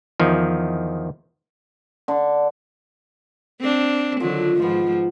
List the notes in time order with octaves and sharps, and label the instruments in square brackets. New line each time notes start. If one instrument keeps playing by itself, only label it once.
[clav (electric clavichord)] E2 D#3 F3
[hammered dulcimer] D3
[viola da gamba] C4 D4
[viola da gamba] D3 D#3 F#3 [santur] F3
[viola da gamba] G#2 F3 [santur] B3 F4